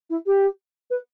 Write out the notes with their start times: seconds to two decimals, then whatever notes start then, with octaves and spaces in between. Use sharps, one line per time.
0.10 E4
0.26 G4
0.90 B4